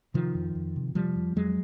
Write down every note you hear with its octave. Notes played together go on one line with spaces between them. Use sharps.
C3 D#3 F3
F2
F2
C3
C3 F3 G3
F2
F2 F#3 G#3